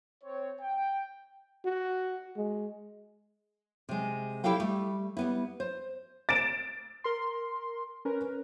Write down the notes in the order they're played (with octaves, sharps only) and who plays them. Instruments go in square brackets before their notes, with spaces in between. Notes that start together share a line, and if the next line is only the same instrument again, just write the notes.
[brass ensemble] C4 C#5
G5
[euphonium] F#4
G#3
[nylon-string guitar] C3 G#3
G3 E4 G4 A4 F5 G5
G3 A3
G3 B3 E4
C5
[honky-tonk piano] A6 D7 E7
[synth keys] A#4 C6
C#4 A#4 B4